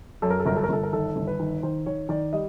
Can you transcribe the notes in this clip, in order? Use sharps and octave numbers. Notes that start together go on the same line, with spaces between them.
F#2 A4
A#4
A4
G1 A#4
A4
A#4
G1 A4
A#4
D#3 A4
G1
B4
D#3
D#3 C5
D#3 C#5
D#3 D5
G3 D#5